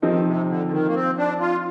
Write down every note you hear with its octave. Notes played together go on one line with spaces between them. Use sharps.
D#3 F3 C4 D#4 G4
C3
D3
D3
D#3
A#3
C4
D4
F4